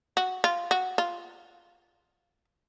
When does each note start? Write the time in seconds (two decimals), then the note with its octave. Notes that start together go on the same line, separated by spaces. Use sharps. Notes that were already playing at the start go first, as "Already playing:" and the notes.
0.17 F#4
0.44 F4
0.71 F#4
0.98 F4